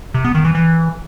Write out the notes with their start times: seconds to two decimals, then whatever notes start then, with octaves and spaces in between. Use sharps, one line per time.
0.14 C3
0.25 B3
0.35 D#3
0.45 E3
0.55 E3